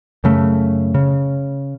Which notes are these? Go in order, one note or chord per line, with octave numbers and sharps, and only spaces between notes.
F#2 C#3 A3
C#3